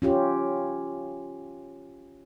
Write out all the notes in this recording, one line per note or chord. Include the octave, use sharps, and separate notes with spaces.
C#4 F4 G4